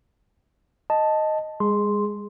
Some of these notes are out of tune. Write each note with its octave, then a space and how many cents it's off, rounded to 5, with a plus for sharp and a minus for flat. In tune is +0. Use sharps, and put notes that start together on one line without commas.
D#5 +0 A5 +0
G#3 -35 G#4 +0 C6 +0